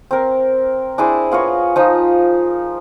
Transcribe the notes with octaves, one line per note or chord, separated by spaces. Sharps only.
C4 A#4
D4 E4 G#4 C5
B3 F4 A#4 C#5
F3 D#4 C5